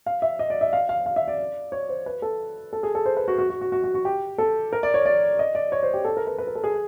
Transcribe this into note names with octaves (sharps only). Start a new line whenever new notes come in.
F5
E5
D#5
D5
E5
F5
F5
F5
E5
D5
C#5
C5
B4
A4
A4
G#4
A4
C5
B4
F#4
F#4
F#4
F#4
F#4
F#4
F#4
G4
A4
A#4
D5
C#5
D5
D#5
D5
C#5
C5
G4
A4
A#4
B4
B4
A#4
A4
G#4